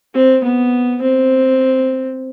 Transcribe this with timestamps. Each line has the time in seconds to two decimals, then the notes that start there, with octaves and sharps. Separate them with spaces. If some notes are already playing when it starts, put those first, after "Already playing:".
0.14 C4
0.44 B3
1.01 C4